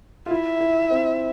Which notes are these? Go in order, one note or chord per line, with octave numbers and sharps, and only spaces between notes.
F4
E4 E5
E4
C4